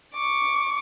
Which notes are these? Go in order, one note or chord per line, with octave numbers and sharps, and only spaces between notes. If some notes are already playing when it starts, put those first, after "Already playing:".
C#6 D6